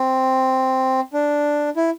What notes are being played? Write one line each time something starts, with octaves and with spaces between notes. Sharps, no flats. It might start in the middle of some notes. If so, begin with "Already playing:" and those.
Already playing: C4
D4
E4